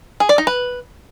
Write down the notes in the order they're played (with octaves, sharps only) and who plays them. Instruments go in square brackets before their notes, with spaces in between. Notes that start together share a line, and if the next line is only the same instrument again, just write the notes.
[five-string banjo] G#4
D5
D#4
B4